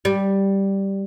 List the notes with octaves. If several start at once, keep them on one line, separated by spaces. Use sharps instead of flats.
G3